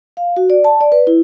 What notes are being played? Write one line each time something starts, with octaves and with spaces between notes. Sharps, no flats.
F5
F#4
D5
A5
D5
B4
E4